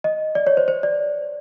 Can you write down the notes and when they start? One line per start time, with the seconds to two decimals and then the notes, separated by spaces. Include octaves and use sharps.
0.04 D#5
0.35 D5
0.47 C#5
0.57 C5
0.68 C5
0.83 D5